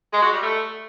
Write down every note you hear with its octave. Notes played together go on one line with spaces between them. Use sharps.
G#3
F#4
G3
A3